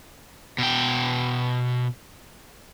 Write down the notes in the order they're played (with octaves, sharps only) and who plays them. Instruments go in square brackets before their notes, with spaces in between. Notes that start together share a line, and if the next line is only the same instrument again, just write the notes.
[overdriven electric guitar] B2 G5